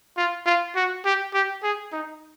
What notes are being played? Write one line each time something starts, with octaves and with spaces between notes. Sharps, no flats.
F4
F4
F#4
G4
G4
G#4
D#4